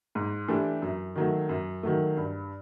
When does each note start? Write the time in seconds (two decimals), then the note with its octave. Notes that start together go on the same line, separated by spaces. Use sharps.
0.15 G#2
0.48 E3 A3 D4 G4
0.82 F#2
1.15 D#3 F#3 A3
1.49 F#2
1.83 D#3 F#3 A3
2.17 G2